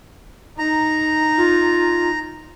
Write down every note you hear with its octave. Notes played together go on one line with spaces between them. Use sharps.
D#4 A#5
F4